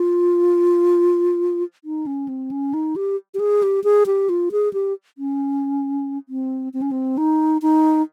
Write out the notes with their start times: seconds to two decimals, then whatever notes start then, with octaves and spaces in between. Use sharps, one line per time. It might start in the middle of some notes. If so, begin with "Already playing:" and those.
Already playing: F4
1.84 D#4
2.06 C#4
2.28 C4
2.51 C#4
2.74 D#4
2.96 G4
3.34 G4
3.39 G#4
3.63 G4
3.84 G#4
4.06 G4
4.29 F4
4.52 G#4
4.73 G4
5.18 C#4
6.29 C4
6.74 C4
6.82 C#4
6.91 C4
7.18 D#4
7.62 D#4